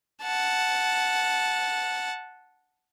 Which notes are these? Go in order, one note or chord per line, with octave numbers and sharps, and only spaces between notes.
F#5 A5